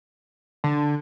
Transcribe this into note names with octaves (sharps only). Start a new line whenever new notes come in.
D3